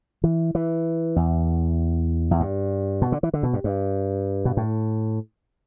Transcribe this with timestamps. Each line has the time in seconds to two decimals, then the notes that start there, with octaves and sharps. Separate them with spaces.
0.24 E3
0.55 E3
1.16 E2
2.31 E2
2.40 G2
3.02 B2
3.12 D3
3.23 E3
3.34 D3
3.43 B2
3.53 G2
3.64 G2
4.45 B2
4.57 A2